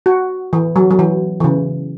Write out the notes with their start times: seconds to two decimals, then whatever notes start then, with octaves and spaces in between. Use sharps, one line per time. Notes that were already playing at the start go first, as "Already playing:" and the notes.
0.06 F#4
0.53 E3
0.76 F#3
0.91 F#3
0.99 E3
1.40 E3
1.44 C#3